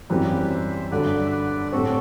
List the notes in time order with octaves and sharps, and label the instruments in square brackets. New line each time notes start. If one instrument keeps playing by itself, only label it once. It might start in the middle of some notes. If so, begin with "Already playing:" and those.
[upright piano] F#2 E3 G3 C4 [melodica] G4 B4
[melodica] C5 E5
[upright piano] G2 D3 F#3 [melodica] B4 D5
[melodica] E5
B4 D5
[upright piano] A2 G3 C4 [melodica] F#4 A4